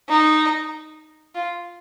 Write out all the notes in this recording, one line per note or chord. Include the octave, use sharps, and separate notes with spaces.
D#4
F4